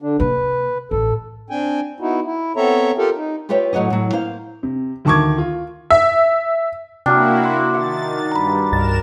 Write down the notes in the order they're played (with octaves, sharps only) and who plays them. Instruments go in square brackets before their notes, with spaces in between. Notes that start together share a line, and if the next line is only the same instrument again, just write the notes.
[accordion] D3 D4
[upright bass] C3 A#3 [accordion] B4
[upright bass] A1 [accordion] A4
[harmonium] C4 D4 G5 G#5
B3 D#4 E4 F#4
E4
B3 C4 A4 C#5 E5 A#5
F4 G4 A4 A#4
D#4
[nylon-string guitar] F4 G4 B4 C#5 E5 G5
A2 F#3 F#4 C#5 D#5
A2 F#3
A#3 C5 F5
[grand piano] C3
D2 D#3 A5 C#6 D6 G#6
F4
[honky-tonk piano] E5
[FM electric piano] C3 [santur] F#3 D4 [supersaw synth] A#3 E4 F#4 [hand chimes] G5 F6
[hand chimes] E5 C6
[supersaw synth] D#3 A6 [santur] F#5
[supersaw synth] G2 [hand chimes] A#5 B5
[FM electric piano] C2 G2 A6 [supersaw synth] A#4 E7